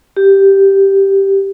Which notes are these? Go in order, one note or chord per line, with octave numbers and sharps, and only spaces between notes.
G4